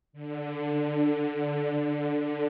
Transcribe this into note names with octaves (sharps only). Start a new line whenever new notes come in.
D3
D3
D3